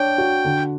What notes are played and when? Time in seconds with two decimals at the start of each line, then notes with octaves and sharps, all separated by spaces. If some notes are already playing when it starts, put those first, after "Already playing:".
Already playing: D4 C#5 G5
0.18 F#4
0.45 D3